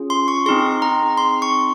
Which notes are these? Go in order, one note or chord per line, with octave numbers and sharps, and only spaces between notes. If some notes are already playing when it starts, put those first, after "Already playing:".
Already playing: C#4 F4 G#4
C6
C#6
C4 D#4 G#4 C6
A#5
C6
C#6